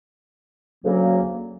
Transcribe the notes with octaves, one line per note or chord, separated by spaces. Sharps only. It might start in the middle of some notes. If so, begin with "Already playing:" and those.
D2 C#3 F#3 A#3